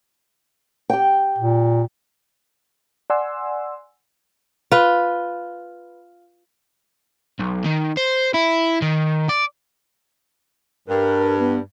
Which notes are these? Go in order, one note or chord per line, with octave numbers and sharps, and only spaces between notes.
G4 G5
A#2
D5 F#5 G#5 C6 E6
F4 B4
B1
D#3
C5
E4
D#3
D5
G2 A#4
B3